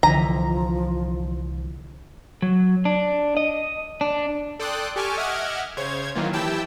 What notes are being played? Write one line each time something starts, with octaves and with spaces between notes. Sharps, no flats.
C2 D3 E3 F3 D#5 A#5 B6
F#3
D4
D#5
D4
A4 D5 G5 C6 D#6 F#6
G4 A4 G#5 C#6 D6 F6
D#5 E5 F#5 D6 F6 G#6
C#3 C5 C#5 G#6
D#3 E3 F#3 A#3 F4
E3 E4 G4 G5 A5 E6